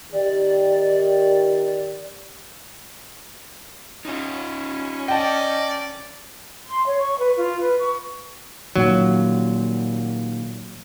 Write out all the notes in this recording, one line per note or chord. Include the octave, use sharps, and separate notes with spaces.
D#3 G4 D5
C#4 D#4 F4
D5 D#5 G5 A5
C6
C#5
C#6
B4
F4
B4
C#6
A#2 D#3 F#3